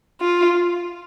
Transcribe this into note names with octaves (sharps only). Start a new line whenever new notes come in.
F4